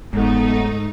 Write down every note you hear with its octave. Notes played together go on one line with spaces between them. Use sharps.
F#1 G#2 A3 B3 D#4